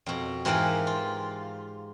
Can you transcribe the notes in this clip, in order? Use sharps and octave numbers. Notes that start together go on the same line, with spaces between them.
F2 B2
G#2 E3 G4 A#4 B4 F5
F4